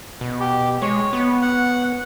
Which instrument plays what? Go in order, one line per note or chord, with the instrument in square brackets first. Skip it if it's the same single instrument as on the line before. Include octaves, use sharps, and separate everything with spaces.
[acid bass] B2
[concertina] G4
[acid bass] G#3 [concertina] C#5
[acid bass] B3
[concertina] F#5